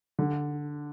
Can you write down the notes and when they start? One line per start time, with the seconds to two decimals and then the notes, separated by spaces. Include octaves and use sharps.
0.19 D3